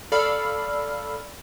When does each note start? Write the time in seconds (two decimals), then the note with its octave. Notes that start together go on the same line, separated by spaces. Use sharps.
0.12 A4 D5 F5 B5 F6